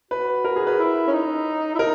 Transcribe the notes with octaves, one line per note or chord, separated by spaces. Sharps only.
F#4 B4
A#4
G#4
B4
E4
C#4
D#4
E4
D#4 A#4